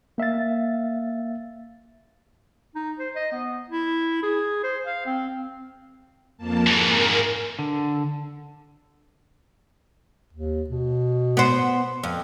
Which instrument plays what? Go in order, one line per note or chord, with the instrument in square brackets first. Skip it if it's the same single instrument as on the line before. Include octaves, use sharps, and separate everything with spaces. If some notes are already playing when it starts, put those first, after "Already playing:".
[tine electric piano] A#3 E5 F5 A6
[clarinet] D#4
C5
D#5
B3
E4
G#4
C5
F5
C4
[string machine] F2 A#3 A5
[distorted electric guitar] G#2 E3 [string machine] A#4
[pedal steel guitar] D3
[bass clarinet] D#2
B2
[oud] B3 C5
F2